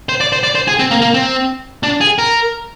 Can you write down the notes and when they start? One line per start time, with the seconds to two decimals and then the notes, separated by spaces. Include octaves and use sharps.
0.09 C5
0.20 D5
0.32 C5
0.43 D5
0.55 C5
0.67 G#4
0.79 C4
0.91 A#3
1.01 A#3
1.14 C4
1.83 D4
2.01 G#4
2.18 A#4